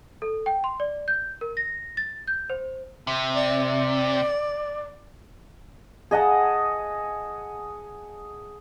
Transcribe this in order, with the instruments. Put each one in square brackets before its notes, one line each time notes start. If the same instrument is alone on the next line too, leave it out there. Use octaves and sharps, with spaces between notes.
[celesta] A4
G5
C6
D5
G6
A#4
A#6
A6
G6
C5
[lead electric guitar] C3
[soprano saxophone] D5
[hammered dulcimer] G#4 D#5 F#5 A5